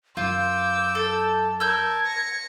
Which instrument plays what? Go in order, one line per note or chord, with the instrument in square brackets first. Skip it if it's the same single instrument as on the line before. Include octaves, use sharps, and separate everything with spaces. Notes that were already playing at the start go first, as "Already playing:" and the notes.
[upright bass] F#2 [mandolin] F4 [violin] D6 E6 [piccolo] G6
[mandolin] A4
[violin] A#4 A5 [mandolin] E6 G6 [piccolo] G#6
[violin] A#6 C#7